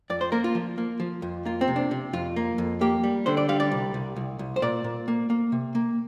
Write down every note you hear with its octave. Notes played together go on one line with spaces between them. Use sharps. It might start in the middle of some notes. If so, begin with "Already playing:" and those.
F2 D5
C5
A#3 A#4
F4
F3
A#3
F3
F2
A#3 F4
C4
C3
D4
C3
F2 F4
A#3
F2
A#3 G4
G3
D3 C5
D5
G3 F5
D5
C2
C2
C2
C2
C5
A#2 D5
A#2
A#3
A#3
C3
A#3